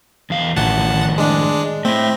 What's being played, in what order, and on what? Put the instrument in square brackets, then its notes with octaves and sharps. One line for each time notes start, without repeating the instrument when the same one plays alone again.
[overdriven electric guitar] E2 F5
[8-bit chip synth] A1 F#5 A5 [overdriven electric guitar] A2 D#3
[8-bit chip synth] G#3 D4
[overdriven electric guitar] A3 E4 [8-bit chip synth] C4